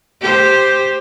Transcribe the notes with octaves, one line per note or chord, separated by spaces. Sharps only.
G4 C5